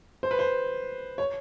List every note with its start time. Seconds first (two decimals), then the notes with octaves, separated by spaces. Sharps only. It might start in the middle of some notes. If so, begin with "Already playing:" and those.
0.23 C5
0.31 B4
0.39 C5
1.18 C#5